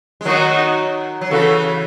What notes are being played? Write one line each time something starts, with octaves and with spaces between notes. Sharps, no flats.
G#3
D#3 F#3 D#4 F#4
F#3
C#3 E3 F#4 A4